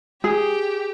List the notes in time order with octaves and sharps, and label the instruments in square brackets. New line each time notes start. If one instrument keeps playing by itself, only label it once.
[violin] G4 [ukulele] G#4